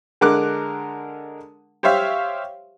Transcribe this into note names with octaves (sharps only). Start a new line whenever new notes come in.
D3 G#3 A#4 D6 F#6
G4 C5 C#5 E5 F5